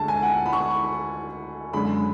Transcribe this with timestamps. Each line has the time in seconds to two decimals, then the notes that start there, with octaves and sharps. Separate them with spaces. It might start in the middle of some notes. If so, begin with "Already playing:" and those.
Already playing: D2 D3 G#3 A5
0.08 G#5
0.23 F#5
0.46 B5
0.53 C#6
1.73 F#2 D3 G#3 B5